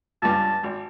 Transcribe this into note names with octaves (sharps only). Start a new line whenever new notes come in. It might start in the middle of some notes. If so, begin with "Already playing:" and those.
C#2 G2 A5
G#1